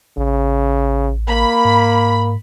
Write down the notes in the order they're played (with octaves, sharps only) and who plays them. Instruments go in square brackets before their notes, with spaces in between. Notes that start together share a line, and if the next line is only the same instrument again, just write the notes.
[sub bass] A1 [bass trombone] C#3
[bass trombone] A#3 [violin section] B5
[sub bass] G#2